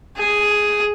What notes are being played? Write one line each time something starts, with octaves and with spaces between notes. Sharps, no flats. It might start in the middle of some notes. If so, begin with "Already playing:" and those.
G#4